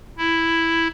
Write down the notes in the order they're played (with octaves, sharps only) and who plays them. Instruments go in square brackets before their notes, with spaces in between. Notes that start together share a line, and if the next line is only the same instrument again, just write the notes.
[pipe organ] E4